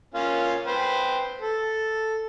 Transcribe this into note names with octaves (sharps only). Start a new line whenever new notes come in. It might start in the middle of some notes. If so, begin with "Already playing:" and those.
A#3 C#4 F4
B4 C5 G5
A4